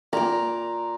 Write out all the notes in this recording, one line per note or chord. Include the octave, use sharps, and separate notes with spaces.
A#2 A#5 D6